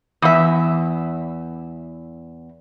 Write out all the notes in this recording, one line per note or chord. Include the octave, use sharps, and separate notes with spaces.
E2 E5